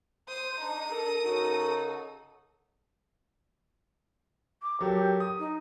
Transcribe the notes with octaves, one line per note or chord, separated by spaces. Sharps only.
C5 D#6
D4 D#4
A4 A#4
C#3 D#4 F#4 A4
D6
F#3 G4 A4 A#4
D#6
D#4